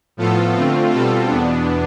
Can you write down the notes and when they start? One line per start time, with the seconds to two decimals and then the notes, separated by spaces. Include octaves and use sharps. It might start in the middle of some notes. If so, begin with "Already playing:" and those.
0.17 A2 F3 B3 F4 A4
0.54 D3 A3 C4 F4
0.91 B2 G3 C4 F4 A4
1.27 E2 B2 B3 D4